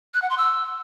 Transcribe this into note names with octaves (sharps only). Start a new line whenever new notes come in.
F#6
F#5
C6
E6